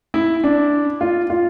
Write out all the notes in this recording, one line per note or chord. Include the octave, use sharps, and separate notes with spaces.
E4
D4
F4
F4